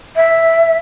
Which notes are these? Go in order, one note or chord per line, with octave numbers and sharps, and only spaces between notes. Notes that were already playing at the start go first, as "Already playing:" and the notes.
E5